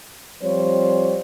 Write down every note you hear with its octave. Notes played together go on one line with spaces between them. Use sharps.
F3 G3 C4 C5 C#5